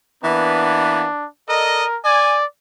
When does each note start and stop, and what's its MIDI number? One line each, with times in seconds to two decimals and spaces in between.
0.24 1.08 52
0.24 1.08 58
0.24 1.08 59
0.24 1.26 62
1.49 1.85 69
1.49 1.98 70
1.49 1.85 74
1.49 1.85 75
2.05 2.45 74
2.05 2.38 80